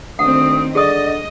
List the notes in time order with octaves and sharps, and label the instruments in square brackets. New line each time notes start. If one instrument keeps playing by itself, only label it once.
[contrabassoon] D2 [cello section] D#3 C4 [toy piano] F#5 [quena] D#6
[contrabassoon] D3 [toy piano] G#4 D#6 [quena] D5 [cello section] D#5